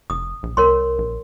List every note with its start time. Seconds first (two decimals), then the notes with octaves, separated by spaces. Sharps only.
0.10 F1 D#6
0.43 A#1
0.57 C2 A#4 C#5 C6
0.98 A#1